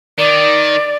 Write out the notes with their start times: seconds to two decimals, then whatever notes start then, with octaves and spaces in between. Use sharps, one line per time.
0.18 D#3 D5